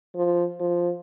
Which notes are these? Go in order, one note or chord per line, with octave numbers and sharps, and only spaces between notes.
F3
F3